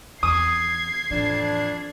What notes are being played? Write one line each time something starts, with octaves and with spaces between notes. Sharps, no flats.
E2 D#6 G#6 C7
F2 A2 E3 D4